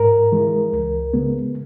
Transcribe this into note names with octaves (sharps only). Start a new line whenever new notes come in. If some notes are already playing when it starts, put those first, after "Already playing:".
Already playing: G#2 A#4
E3 G#3
C#2
C#3 G#3 B3